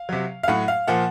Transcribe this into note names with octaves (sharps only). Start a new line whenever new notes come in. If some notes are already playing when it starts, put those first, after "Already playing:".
Already playing: F5
C3 F#3
F5
A2 F#3 F#5
F5
A#2 F3 F#5